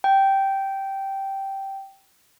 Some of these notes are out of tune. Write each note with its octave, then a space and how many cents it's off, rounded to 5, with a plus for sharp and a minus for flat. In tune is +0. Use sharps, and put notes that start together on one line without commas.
G5 -10